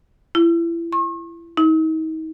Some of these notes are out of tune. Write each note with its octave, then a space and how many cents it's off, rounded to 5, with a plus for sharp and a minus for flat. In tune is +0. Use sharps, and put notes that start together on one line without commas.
E4 +30
C#6 -45
D#4 +40